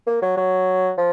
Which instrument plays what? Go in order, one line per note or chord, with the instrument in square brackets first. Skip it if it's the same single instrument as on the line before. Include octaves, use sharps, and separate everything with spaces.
[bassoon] A#3
F#3
F#3
F3